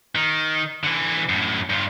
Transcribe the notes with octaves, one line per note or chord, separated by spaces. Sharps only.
D#3
D3 E3
F#2 A2
G2 F4